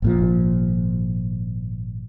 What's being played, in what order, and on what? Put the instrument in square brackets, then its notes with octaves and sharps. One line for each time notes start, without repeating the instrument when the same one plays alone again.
[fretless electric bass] G#1 A#2 F3